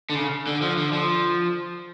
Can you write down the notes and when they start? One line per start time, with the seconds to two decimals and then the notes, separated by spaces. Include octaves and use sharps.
0.10 D3
0.15 C#3
0.47 D3
0.62 F3
0.77 D3
0.93 F3